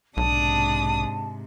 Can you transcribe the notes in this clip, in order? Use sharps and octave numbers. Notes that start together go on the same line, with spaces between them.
B1 G#2 C3 D4 A5 D#6